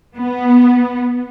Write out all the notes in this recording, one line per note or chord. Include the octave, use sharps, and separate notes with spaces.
B3